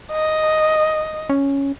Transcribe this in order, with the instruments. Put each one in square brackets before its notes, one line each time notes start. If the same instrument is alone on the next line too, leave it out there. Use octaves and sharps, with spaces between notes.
[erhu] D#5
[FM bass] C#4